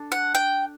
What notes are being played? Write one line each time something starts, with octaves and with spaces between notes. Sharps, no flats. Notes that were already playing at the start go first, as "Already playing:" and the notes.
Already playing: D4 A4
F#5
G5